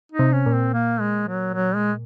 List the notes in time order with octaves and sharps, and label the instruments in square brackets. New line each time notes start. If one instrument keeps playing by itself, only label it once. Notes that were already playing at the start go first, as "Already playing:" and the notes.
[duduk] D#4
[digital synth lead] C3
[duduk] C#4
[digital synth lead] A#2
[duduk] C4
A#3
G#3
F#3
F#3
G#3